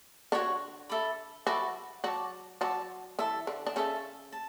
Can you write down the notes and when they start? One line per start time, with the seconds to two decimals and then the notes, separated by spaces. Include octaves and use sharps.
0.32 D3 D4 F#4 C#5 F#5 C#6
0.89 A4 E5 B5 D6
1.46 F#3 F#4 A4 E5 B5 D6
2.04 F#3 F#4 D5 A5 D6
2.61 F#3 F#4 D5 A5 D6
3.19 E3 E4 A4 E5 A5
3.47 D3 D4
3.67 D4
3.76 C#3 C#4 A4 E5 A5
4.32 A5